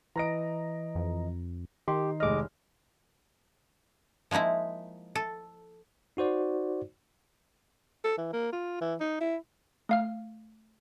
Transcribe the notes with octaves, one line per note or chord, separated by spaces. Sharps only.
E3 D#5 A#5 A#6 D7
F2
D#3 D#4 G4 C6
F1 G#3 D#5 D6 F6
F3 G#3 A#3 D#4 E4
A4
D#4 F#4 C5 D5
A4
E3
A#3
F4
E3
D#4
E4
A3 F5 F6